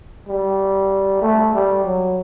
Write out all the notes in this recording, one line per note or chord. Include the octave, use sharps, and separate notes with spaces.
G3
A3
G3
F#3